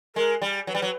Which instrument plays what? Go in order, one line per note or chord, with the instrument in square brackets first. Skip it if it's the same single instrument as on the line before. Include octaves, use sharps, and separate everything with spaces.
[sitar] G#3 [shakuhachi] A#4
[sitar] G3
[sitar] F#3 [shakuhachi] B4
[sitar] G3
F#3